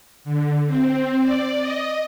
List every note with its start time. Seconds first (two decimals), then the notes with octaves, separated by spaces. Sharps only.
0.24 D3
0.67 C4
1.22 D5
1.60 D#5